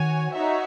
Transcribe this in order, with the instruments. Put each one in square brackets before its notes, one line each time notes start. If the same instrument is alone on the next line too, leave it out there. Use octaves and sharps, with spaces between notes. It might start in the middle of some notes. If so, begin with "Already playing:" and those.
Already playing: [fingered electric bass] D#3 [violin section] F#4 C#5 G#5
[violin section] D#4 F#4 C#5 E5